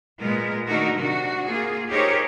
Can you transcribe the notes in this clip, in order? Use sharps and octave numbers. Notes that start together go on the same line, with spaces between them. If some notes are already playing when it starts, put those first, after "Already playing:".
A#2 G#3 B3 A#4
D#3 A3 D4 D#4 F#4 A#4
C3 D4 F#4
A#3 F4 G#4
D#4 G4 G#4 A#4 C5 C#5